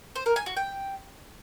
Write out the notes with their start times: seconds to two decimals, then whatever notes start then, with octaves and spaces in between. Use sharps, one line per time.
0.16 C5
0.26 A#4
0.36 G#5
0.46 F#4
0.56 G5